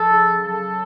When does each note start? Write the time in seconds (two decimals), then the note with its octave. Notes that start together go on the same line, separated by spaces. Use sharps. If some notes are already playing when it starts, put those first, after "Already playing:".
Already playing: F3 A4
0.11 C#3
0.41 F#3 A4